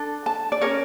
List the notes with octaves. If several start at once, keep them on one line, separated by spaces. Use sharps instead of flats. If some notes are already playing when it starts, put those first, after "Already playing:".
Already playing: D4 A4
A5
D5
C#4 G4 A#4 C#5